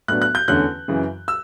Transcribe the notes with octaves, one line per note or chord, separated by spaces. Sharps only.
A2 F#3 B3 D4 F#6
F#6
G6
E2 D3 A3 C#4 F#6
F#2 C#3 E3
E6